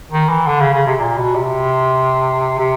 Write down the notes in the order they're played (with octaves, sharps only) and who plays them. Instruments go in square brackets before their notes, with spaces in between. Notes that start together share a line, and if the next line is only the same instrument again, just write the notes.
[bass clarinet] D#3
E3
D3
C#3
C#3
C3
A#2
B2
C3
C3